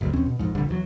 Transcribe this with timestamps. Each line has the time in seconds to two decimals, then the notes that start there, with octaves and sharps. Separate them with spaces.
0.01 G#1 D2 F#3
0.13 D#1 E2 C4 C#4
0.26 B2
0.39 A#1 F2 G#2
0.55 F1 A#1 D3 G3
0.69 E2 E3 F#3